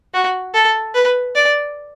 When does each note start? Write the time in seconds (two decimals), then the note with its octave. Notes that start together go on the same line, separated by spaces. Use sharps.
0.14 F#4
0.54 A4
0.94 B4
1.35 D5